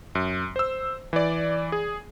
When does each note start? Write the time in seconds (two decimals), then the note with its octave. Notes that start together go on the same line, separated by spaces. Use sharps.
0.15 F#2
0.56 C5 E6
1.13 E3 D5
1.72 G#4